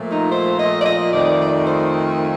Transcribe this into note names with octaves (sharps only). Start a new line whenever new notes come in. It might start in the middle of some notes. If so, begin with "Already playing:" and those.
Already playing: A#2 F3 A3
D#4
C5
D#5
D5
D#5
F2 D#3 A3 D5
D5
C5